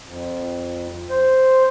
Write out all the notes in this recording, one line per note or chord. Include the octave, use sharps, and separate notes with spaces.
F2
C5